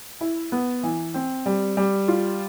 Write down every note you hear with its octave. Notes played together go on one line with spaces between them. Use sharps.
E4
B3
E3
C4
G3
G3
F4